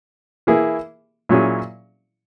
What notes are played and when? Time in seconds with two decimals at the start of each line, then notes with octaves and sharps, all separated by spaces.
0.47 E3 A#3 E4 G#4
1.29 A#2 F#3 C#4 E4 G#4